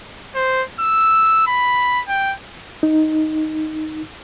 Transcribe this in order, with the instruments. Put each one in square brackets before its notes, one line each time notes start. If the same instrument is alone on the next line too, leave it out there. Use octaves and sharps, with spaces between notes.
[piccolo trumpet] C5
E6
B5
G5
[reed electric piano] D#4